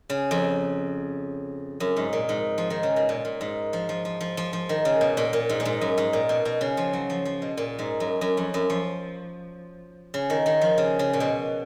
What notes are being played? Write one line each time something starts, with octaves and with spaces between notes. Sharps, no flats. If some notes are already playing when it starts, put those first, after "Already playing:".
C#3
F2
F#2
G#2
A#2
G#2
F3
D#3
C#3
B2
A#2
A#2
G#2
F3
F3
F3
F3
F3
F3
D#3
C#3
B2
A#2
A#2
G#2
A#2
G#2
F#2
G#2
A#2
B2
B2
C#3
F3
F#3
F3
F3
B2
A#2
G#2
F#2
F#2
F2
F#2
F3
C#3
D#3
D#3
F3
C#3
C#3
A#2
B2